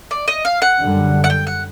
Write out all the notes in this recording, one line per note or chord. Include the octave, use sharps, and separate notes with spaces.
D5
D#5
F5
F#5
F#2 D3 G3
F#5
G5
F#5